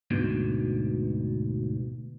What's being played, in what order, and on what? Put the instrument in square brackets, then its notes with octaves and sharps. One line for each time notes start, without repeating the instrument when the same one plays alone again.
[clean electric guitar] D2 G#2 B2